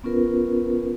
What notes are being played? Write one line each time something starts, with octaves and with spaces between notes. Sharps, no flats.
B3 C#4 F4 A#4 B4